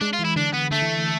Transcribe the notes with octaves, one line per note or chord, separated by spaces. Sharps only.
G#3 D4
F4
E3
E4
D3 D4
B3
D3 A3
E3